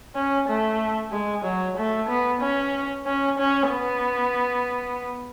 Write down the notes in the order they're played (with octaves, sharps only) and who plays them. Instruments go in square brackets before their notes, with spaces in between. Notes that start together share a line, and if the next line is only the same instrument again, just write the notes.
[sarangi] C#4
A3
G#3
F#3
A3
B3
C#4
C#4
C#4
B3